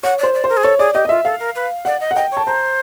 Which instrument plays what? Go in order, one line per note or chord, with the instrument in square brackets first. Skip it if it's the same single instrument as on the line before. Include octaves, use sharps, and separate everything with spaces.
[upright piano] C#5 [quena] F#5
[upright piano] C5 [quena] D5
[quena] D5
[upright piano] C5
[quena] A#4
G#4
[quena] A4 [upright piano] C#5
[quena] G#4 [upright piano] D5
[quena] G4 [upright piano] D#5
[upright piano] D#5
[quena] F4 [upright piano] E5
[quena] A4 [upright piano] F5
[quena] A#4
B4
[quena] D5 [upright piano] F#5
[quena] D#5
[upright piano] F#5
[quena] D#5 [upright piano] G5
[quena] C#5
[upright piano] A5
[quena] C5 [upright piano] A#5